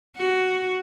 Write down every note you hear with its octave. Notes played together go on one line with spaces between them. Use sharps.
F#4